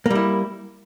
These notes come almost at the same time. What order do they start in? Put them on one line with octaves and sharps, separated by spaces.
A#3 G3 E4